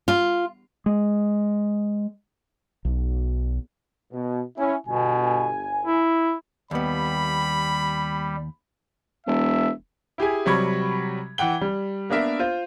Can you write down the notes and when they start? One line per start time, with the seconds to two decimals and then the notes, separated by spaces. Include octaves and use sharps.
0.08 F4
0.86 G#3
2.85 B1
4.12 B2
4.57 C#4 E4
4.87 G1 B2 G#5
5.85 E4
6.71 D#2 G3 B3 B5
9.27 E1 E5
10.18 E4 G4 G#4 G#5
10.45 C3 F#3 G3 B5 C#6 G#6
11.38 E3 F#5 G5 G7
11.61 G3
12.10 A#3 B3 D4 A#4 E5
12.39 F4 C5